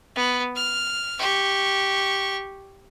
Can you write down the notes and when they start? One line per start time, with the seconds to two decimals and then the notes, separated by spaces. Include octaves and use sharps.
0.16 B3
0.56 F6
1.19 G4 C#6